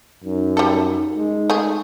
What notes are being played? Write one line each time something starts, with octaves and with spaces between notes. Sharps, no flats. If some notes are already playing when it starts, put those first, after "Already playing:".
F#2 D#4
G3 A4
G#3
A3 G#4